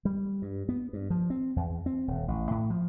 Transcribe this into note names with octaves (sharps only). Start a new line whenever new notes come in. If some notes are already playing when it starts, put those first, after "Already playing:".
G3
G2
B3
G2
F3
C4
E2
C4
D#1
A1
A2
F3